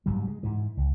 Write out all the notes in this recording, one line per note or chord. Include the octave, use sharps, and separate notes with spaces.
F#1 G#2 F#3 G3
G#3
G#2 E3
C#2